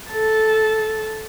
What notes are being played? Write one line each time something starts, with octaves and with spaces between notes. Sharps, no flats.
A4 A5